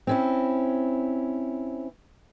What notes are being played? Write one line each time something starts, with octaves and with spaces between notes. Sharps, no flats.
C4 C#4 E4